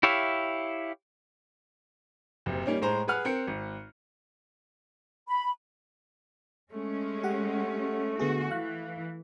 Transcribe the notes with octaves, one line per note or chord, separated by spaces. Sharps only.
E4 G4 C#5 E5 F5
F#1 C3
G3 A#3 C#4 D#4
A2 G#3 C5 A#5
G#4 B4 F#5 F6 F#6
C4 A#4 C#7
G#1
B5
G#3 A3 C#4
G4 F#5
D3 B3 F#4 G#4
E3 F5 F#6